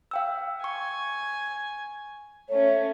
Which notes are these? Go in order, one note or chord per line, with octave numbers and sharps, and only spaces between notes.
F5 G5 E6
G#5 C#6
A3 C#4 C#5